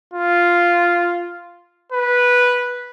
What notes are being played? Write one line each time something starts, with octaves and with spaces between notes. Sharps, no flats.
F4
B4